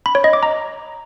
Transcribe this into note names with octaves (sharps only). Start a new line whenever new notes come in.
B5
C#5
D#5
D6
A#5